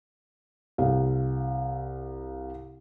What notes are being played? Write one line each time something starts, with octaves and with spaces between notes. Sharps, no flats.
C2 F5